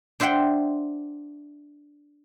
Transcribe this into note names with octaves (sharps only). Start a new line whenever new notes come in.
D4 C5 E5 F#5 G5